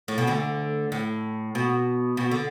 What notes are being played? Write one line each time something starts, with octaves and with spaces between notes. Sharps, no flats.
A2
B2
D2 D3
A2
B2
B2
D3